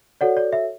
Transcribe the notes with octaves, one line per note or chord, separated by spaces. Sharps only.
F#4 A4 C#5 D5 F#5
D5
E5